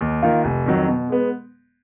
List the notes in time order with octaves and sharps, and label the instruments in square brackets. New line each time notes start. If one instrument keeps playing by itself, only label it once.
[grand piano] D#2
D#3 A#3 F4
F1
F2 D#3 F#3
B2
G#3 B3